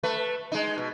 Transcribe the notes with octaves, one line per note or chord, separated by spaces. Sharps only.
A3 B4
G#3 D#4
B2